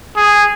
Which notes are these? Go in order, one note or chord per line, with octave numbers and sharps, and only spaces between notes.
G#4